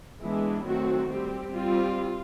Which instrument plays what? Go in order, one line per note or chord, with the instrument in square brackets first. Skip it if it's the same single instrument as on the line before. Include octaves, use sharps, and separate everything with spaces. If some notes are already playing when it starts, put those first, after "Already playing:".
[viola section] E3 G#3 B3 D4 E4
D#3 F#3 A3 C4 F#4
G3 C4 G4
G3 C4 F4